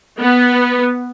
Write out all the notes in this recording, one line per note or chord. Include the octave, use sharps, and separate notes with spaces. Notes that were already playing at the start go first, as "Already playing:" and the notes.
B3